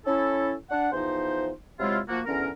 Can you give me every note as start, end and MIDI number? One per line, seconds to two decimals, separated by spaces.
0.06 0.53 61
0.06 0.53 64
0.06 0.53 69
0.70 0.88 62
0.70 0.88 78
0.93 1.50 40
0.93 1.50 53
0.93 1.50 63
0.93 1.50 72
1.79 1.99 48
1.79 1.99 54
1.79 1.99 56
1.79 1.99 64
1.79 1.99 65
2.09 2.20 53
2.09 2.20 58
2.09 2.20 66
2.26 2.48 40
2.26 2.48 50
2.26 2.48 61
2.26 2.48 70